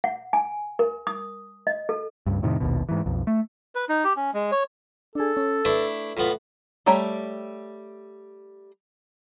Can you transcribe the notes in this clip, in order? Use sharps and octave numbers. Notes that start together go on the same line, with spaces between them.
F#5
G#5
A#4
D#6
D#5
A4
C#2 G2
F2 A2 C3 D#3
A#1 D#2 B2
G#2 E3
B1 F2
A3
B4
D#4
G4
C#4
G#3
C#5
D4 G#4 A4
C#4
A3 D4 E4 B4
A2 B3 F4
G3 A3 C#5 G5 A#5